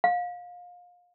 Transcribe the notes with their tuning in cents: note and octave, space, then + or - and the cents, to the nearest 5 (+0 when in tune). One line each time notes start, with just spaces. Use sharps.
F5 +30